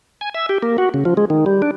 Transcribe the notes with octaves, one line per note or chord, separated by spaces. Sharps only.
G#5
E5
G4
A#3
F#4
C#3
F3
G#3
D#3
G3
D4